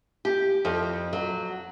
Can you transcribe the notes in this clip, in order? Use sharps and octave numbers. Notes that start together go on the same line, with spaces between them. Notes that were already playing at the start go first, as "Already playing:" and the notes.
G4
F2
F#3